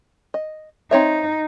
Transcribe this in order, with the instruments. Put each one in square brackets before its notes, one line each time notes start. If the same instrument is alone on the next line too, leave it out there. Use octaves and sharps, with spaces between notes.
[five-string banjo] D#5
[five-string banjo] C4 C#5 E5 [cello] D#4